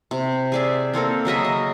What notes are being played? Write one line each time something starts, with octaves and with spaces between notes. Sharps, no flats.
C3
G#4 D5 E5
A#3 C4 A4 A#4
C#3 F#3 D#5 E5
D#5